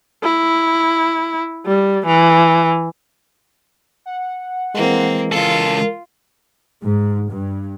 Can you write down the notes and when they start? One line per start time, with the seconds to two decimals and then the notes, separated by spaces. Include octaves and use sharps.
0.23 E4
1.66 G3
2.06 E3
4.06 F#5
4.74 E3 G#3 A#3 C4
5.32 C#2 F4 A4 A#4
6.83 G#2
7.31 G2